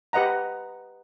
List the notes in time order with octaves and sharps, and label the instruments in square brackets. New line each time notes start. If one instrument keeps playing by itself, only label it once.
[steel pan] G4 B4 D#5 F#5 A#5